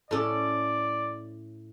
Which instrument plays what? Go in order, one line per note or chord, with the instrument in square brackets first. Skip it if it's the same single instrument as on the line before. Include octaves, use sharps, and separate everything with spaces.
[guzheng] A2 C#4 A4 [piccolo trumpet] D5